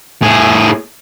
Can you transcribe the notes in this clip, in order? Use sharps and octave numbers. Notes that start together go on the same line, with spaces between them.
A2 G#4